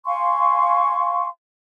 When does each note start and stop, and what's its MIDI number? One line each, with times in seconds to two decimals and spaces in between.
0.05 1.27 77
0.05 1.27 80
0.05 1.27 84
0.05 1.27 85